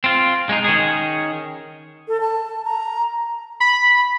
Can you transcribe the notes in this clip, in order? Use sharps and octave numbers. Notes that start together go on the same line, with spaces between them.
C4 F4
G#3 C#4 D#4
D#3 C#4 G#4
A4
A5
A#5
B5